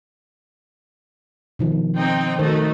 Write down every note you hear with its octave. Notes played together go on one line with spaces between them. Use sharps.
B2 D#3 F3
C4 D#4 G5
D#3 A3 D#4 F#4 A#4 C5